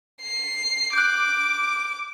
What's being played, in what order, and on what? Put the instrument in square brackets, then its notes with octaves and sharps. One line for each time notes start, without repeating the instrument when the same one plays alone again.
[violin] C7
[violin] D6 [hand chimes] F#6 G6